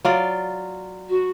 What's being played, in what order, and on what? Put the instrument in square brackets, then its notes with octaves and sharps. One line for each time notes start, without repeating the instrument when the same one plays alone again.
[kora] F#3 F4 D5
[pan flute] F#4